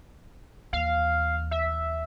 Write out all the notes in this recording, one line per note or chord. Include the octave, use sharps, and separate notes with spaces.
D#2 E3 F5
E5